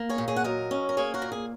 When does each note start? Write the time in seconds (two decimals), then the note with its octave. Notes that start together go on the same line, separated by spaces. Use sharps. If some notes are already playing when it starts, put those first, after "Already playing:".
Already playing: A#3
0.09 G#4 C#5
0.18 A#2
0.28 G#4 C#5
0.36 F#5
0.44 F#3 A#4 D#5
0.71 C#4
0.89 A#4
0.97 A#3 G#4 C#5
1.14 F#4 A#4
1.22 A#2
1.32 G#4